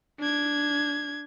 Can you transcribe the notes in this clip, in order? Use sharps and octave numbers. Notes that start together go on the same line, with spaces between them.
D4 G#6